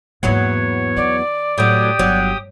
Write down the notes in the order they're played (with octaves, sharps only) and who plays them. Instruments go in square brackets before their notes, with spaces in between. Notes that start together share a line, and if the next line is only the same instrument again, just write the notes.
[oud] E2 F#3 B3 [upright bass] G#2 A#3 [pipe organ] C#5
[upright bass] D#3 [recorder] D5
[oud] A2 F#3 [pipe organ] G4 G5 D#6
[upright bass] G1 [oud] F#3